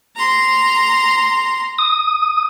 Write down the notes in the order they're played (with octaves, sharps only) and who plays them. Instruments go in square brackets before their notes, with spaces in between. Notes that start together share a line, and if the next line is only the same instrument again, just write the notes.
[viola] A#5 C6
[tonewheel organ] D#6